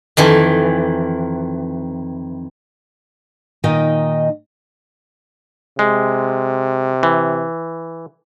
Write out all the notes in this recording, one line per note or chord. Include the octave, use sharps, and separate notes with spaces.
F2 D#3 E3
A#2 D#3 D#4 D#5 G5
C3 G#3
E3